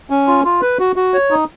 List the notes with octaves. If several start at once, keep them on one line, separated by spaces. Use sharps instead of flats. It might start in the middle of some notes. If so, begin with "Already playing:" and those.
C#4
F4
F4
B4
F#4
F#4
C#5
D#4